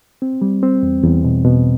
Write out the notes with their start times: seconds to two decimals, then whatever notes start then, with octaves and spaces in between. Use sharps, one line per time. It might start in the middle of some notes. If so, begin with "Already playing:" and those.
0.22 C4
0.42 G3
0.63 C4
0.83 E2
1.03 E2
1.24 B2
1.44 B2